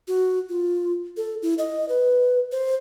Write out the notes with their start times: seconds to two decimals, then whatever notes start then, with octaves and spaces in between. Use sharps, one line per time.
0.08 F#4
0.49 F4
1.17 A4
1.42 E4
1.58 D#5
1.89 B4
2.52 C5